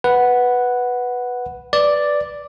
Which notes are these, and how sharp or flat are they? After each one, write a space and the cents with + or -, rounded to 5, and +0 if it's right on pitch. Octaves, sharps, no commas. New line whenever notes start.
B4 +0 F#5 +0
B4 +0 D5 +0